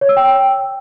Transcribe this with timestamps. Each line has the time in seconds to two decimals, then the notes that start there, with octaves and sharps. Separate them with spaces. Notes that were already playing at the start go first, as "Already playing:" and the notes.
0.01 C#5
0.09 E6
0.17 G5